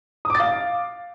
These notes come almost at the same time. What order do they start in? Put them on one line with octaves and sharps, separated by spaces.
D#6 D6 A6 F5